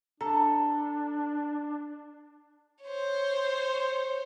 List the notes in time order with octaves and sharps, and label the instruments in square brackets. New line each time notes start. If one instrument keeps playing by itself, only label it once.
[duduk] D4 [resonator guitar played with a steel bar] A4 [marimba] A#5
[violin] C5 C#5